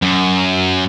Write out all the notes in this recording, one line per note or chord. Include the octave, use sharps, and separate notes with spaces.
F#2